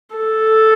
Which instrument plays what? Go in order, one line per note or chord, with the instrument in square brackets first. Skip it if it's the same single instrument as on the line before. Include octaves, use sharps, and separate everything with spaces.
[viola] A4